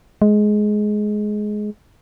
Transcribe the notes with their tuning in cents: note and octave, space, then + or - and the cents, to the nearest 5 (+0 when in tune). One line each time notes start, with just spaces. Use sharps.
G#3 +15